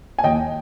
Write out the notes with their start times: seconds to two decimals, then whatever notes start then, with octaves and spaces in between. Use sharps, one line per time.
0.18 G#5
0.24 D#2 D#5 G5